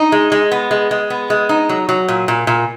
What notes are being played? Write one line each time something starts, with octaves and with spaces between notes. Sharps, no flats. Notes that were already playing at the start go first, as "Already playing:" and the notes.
Already playing: D#4
G#3
G#3
B3
G#3
G#3
B3
G#3
D#4
F#3
F#3
A#2
A#2
A#2